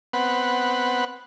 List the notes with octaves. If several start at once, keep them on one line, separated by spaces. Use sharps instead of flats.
B3 C4 B4 F#5